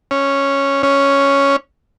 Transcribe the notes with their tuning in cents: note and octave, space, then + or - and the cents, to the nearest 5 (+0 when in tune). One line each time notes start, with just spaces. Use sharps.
C#4 -5
C#4 +0